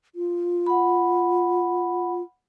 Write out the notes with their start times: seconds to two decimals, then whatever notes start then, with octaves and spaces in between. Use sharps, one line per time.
0.15 F4
0.66 F#5 B5